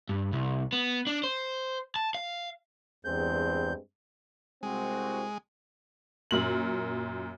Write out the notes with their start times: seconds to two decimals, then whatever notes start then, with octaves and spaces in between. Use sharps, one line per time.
0.09 G2
0.33 C2
0.73 B3
1.07 D4
1.24 C5
1.96 A5
2.15 F5
3.05 E2 G2 G#3 C4 G6
4.63 C2 G#3 C4 F#4
6.31 F#2 A#2 F#7